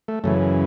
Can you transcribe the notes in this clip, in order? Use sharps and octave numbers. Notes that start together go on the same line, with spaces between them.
A3
F#2 C#3 E3 A3